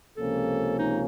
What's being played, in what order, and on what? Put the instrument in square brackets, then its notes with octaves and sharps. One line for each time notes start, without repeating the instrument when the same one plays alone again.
[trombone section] C#2 C3 F3 A#3 C#4 [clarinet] A4
[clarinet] D#4